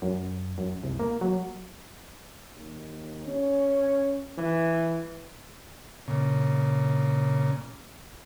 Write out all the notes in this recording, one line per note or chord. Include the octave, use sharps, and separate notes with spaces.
F#2
F#2
C2
A#3
F#3
D#2
C#4
E3
A#2 C#3